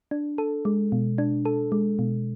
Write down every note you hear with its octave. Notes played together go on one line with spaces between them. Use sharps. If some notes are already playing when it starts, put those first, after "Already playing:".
D4
A4
G#3
B2
D4
A4
G#3
B2